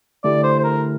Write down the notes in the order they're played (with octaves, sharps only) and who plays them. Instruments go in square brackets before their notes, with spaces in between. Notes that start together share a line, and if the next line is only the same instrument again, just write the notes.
[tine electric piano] D3 A3 E4 G4 [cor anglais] D5
[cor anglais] C5
C5
A#4